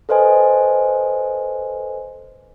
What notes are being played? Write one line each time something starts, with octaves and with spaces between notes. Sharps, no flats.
A4 B4 C5 D#5 G#5